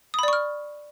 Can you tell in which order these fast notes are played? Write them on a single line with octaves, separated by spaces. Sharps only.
D#6 B5 D5 C#6 F6